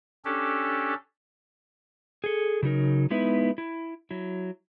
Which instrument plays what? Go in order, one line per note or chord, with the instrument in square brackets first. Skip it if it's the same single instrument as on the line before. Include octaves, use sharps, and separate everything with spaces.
[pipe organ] C#4 D4 G4 A4
[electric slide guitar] G#4 A4
C#3 F#3 D#4 A#4
G#3 B3 D#4 E4 B4 E5
E4
F#3 E4